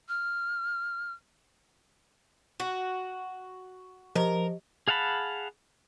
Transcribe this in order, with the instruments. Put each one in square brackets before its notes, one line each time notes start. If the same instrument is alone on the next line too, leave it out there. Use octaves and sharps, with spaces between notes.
[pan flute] F6
[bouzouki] F#4
[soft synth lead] F3 [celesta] G4 D#5 [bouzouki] A#4
[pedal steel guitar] G#4 F5 F#5 A5 B5